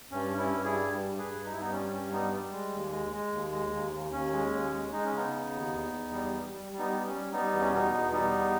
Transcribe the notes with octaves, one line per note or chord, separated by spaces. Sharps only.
G2 C#4
G2
C#4 E4
G2
E4 G#4
G3
G2
G2
G#4 B4
G2
D#4
G2 E4
B3 D#4
G3 C#4
G2 C#4
G3 B3 D#4
G3
G#3
D#2
G#3
G#3
D#2
G#3
D#2
D#2
D#2 C#4
G#3
D#2
G#3
G#3 D#4
C#4
C#3 B3 D#4
C#3
D#2
E2
E2
G3
G3
G3
G3
B3 D#4
G3
C#4
G3
G3 B3 D#4
E2 B3
C#4
B2 B3 D#4
E2
G3 B3 D#4
E2